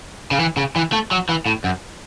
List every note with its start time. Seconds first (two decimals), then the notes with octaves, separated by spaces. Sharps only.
0.31 C#3
0.40 E3
0.57 C#3
0.76 E3
0.92 A3
1.11 F#3
1.29 E3
1.46 A2
1.64 F#2